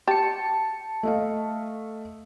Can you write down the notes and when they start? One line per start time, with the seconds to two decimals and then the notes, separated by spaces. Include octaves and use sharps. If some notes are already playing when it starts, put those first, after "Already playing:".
0.08 G4 A5 C#7
1.03 A3 D#5 F5